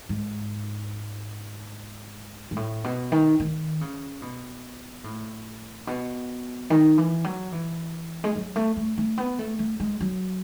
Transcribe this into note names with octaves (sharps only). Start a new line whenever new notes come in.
G#2
G#2
A2
B2
D#3
D#3
C#3
B2
A2
B2
D#3
E3
F#3
E3
G#3
F#3
A3
A3
A3
B3
A3
A3
G#3
F#3